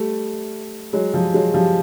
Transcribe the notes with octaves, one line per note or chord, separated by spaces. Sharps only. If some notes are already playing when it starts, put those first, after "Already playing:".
Already playing: G3 A3
F#3 G#3
F3 G3
F#3 G#3
F3 G3